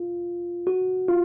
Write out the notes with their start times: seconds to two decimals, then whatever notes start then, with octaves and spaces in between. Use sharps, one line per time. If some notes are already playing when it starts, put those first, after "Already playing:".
Already playing: F4
0.67 F#4
1.08 F4